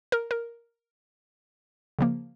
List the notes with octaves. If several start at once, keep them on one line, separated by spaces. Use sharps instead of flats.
A#4
A#4
C#3 F3 A#3